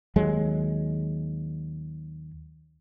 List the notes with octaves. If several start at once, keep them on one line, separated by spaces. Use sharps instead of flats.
D#2 F#3 G#3